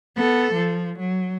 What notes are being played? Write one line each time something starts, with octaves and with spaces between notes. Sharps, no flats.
B3 A4
F3
F#3